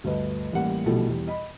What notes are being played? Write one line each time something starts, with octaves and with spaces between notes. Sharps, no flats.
D2 G2 B4 D#5
A1 G3 A#3 F#5
A#1 B2 E3 G3 A3 A4
E2 G3
D#5 B5